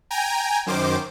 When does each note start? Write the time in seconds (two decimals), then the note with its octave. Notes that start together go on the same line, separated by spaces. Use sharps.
0.11 G5 G#5 A#5
0.66 F#2 D#3 C5 D6